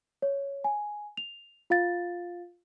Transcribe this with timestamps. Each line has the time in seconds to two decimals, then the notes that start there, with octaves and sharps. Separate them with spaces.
0.22 C#5
0.64 G#5
1.17 F7
1.70 F4 F5 A6